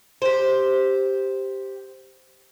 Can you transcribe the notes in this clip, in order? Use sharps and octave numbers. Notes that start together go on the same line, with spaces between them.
G4 C5